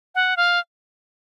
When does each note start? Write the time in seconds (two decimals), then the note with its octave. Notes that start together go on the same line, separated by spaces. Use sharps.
0.15 F#5
0.37 F5